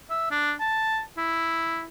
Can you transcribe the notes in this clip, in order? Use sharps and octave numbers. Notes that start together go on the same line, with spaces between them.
E5
D4
A5
E4